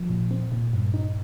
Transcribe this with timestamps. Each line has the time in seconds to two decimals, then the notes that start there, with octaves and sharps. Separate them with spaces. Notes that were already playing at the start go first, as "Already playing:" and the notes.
Already playing: F3
0.09 A#2
0.31 C4
0.52 A#2
0.73 G2
0.94 D#4